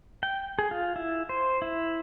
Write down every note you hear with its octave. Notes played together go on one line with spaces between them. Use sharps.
G5
G#4
F4
E4
C5
E4